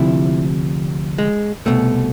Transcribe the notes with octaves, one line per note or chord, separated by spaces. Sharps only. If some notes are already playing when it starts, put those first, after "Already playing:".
Already playing: D2 C3 F3 E4
G#3
C2 B2 A3